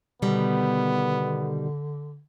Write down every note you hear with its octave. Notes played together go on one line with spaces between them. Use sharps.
B2 D3 D#3 G3 B3